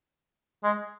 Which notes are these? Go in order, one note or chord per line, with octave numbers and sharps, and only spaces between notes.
G#3